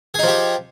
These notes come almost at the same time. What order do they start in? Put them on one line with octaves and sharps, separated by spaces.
G#4 D#4 F3 G4